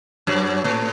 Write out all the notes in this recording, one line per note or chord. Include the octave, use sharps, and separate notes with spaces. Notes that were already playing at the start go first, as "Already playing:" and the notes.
F#2 F#3
A2 A3